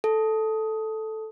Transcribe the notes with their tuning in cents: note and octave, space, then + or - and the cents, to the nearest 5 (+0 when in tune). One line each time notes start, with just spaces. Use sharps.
A4 -5